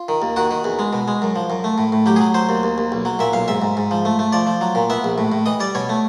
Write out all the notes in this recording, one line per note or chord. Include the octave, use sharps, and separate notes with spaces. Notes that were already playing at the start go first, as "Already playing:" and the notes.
Already playing: F4
D#3
D#2
D#3 F#4
D#3
E2
G#3
B2
G#3
F#2
F3
F#2
A3
A2
A2
F#3 G4
F#3 G#4
F#3 C5
D#2
D#2
D#2
B1
F#3
A#2 E5
B1 F5
G#2 E5
G#2
G#2
F3
A3
A3
F3 D5
F3
F#3
A#2
B3 E5
A#1
A2
A2
E3 D#5
G3 D5
B2 C#5
A3